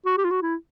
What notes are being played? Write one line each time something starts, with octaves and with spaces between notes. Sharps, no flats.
F#4
G4
F4
F#4
E4